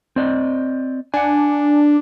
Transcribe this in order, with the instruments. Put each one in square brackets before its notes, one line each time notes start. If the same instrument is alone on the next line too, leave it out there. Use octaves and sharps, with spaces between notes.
[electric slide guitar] C4 D5 D#5
[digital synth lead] D4 [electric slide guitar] F#5 G#5